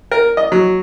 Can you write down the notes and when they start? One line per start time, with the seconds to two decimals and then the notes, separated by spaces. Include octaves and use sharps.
0.12 A#4
0.37 D#5
0.52 F#3